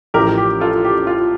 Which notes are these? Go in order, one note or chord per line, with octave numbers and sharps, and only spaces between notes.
A1 A2 F3 G4 A#4
G4
F4 A4
G4
F4